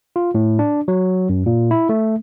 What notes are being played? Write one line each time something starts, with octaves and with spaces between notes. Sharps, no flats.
F4
A2
D4
F#3
F#2
A#2
E4
A3